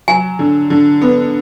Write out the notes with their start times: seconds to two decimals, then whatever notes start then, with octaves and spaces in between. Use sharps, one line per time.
0.08 F#3 G#5
0.39 D3
0.70 D3
1.02 B3